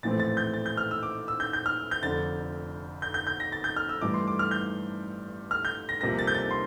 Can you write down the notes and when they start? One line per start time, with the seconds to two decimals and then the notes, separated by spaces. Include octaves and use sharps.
0.03 A#1 A2 E3 A3 C4 A6
0.20 A6
0.37 G6
0.54 A6
0.66 G6
0.77 F6
0.91 E6
1.03 D6
1.28 E6
1.40 G6
1.53 G6
1.66 F6
1.91 G6
2.02 F1 F2 D3 A6
3.02 G6
3.14 G6
3.27 G6
3.40 A#6
3.52 A6
3.64 G6
3.76 F6
3.89 E6
4.01 G2 E3 A3 D6
4.14 C6
4.27 D6
4.39 F6
4.51 G6
5.51 F6
5.65 G6
5.89 A#6
6.01 C2 C3 F3 A#3 A#6
6.19 A6
6.27 G6
6.35 A6
6.51 C6